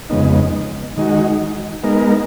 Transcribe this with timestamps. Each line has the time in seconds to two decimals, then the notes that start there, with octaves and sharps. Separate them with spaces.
0.10 F2 C#3 G#3 B3 D#4
0.97 D#3 G#3 D#4 F#4
1.84 G#3 B3 D#4 A#4